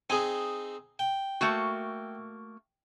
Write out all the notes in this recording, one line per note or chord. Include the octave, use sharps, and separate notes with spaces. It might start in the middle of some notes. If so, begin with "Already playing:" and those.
C4 D#4 G#4 G#5
G5
A3 A#3 F#4